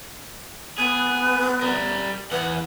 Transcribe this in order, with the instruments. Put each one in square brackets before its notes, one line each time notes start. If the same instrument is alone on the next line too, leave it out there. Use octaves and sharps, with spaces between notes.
[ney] B3 [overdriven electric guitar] G#4
[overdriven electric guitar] G3 A#4
[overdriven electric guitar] E2 F#5 [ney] B4